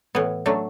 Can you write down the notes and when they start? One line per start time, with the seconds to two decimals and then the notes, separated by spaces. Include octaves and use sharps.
0.15 A2 E3 B3
0.46 F#3 A3 D4